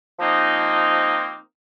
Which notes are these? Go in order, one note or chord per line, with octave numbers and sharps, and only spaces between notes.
F3 A#3 C4 D#4